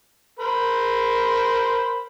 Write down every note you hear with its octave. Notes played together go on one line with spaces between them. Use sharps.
A#4 C5 B5